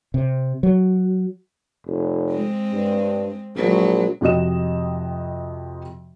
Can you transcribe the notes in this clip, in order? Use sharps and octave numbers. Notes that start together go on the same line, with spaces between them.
C3
F#3
F1
G#3 C4
G2
A#1 F#3 G#3
F2 C3 F#4 D#5 E7